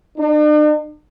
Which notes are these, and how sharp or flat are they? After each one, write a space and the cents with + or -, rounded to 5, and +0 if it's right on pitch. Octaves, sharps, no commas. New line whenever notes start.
D4 +45